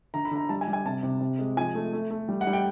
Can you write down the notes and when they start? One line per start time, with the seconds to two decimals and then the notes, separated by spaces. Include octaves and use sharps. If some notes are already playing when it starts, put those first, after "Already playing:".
0.14 D3 A#5
0.25 B5
0.31 D3 A#5
0.49 G3 A5
0.61 G#5
0.68 G3
0.73 G#5
0.85 C3 A5
1.03 C3
1.21 C3
1.39 G#3
1.57 F3 G#5
1.75 A3
1.93 A3
2.11 A3
2.29 G3
2.41 F#5
2.47 G3
2.53 G5